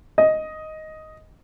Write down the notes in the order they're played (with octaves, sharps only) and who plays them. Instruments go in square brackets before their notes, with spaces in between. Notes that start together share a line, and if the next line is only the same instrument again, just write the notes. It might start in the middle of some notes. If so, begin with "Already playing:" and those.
[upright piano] D#5